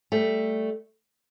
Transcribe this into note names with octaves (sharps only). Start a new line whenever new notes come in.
G3 A3